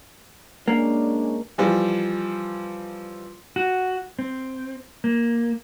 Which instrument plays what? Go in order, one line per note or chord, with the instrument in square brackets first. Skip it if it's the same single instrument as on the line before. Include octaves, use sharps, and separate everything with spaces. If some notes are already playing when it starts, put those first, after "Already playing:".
[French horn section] G#3 C#4 D4 [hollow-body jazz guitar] A#3
[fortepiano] E3 F3 G3
[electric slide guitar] F#4
C4
A#3